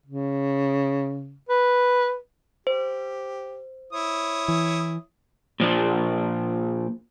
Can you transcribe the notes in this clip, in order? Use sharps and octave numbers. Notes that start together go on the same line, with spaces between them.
C#3
B4
G4 C5
E4 C#5 D#6
E3
A#2 F3 D4